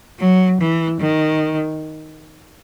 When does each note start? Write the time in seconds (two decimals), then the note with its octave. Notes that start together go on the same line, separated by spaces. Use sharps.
0.20 F#3
0.60 E3
1.00 D#3